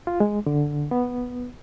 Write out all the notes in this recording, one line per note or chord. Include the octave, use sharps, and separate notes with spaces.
F4
G#3
D3
B3